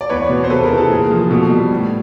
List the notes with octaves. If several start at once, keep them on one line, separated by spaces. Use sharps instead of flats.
D5
E2 B4 C#5
B2
C5
C3 A4 B4
G#4 A#4
E3
A4
A#2 G#4
F3
B2 A4
G3
A2